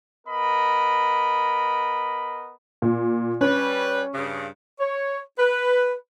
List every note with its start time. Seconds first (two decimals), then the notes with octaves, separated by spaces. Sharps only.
0.27 B3 A#4 D#5 B5
2.82 A#2
3.41 G3 C#4 B4
4.14 G2 C#3
4.80 C#5
5.39 B4